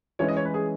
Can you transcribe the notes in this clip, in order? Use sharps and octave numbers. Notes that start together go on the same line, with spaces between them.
E3 G#3 C#4 E4 C#5
D#5
C#5
B4
G#4